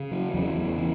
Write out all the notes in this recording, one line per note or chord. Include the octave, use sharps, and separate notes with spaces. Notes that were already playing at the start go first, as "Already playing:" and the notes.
Already playing: C#3
F#3
E2 F#3
E3